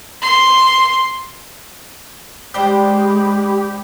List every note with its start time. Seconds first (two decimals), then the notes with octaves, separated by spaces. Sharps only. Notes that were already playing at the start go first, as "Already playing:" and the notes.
0.22 C6
2.54 G#3 D4 G4 C5 G5 B5